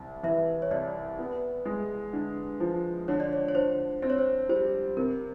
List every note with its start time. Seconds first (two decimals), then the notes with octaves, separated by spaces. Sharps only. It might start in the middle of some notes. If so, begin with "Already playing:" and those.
Already playing: C2
0.23 E3 E5
0.62 C#5
0.71 C2 D5
1.19 B3
1.65 G#3
2.13 D3
2.60 F3
3.08 D3 C#5
3.20 D5
3.33 C#5
3.49 C#5
3.54 D3 C5
4.02 C4 C5
4.10 C#5
4.19 C5
4.49 G3 C5
4.97 C3 A#4